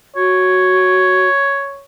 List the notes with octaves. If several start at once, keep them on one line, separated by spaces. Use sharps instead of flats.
F#4 C#5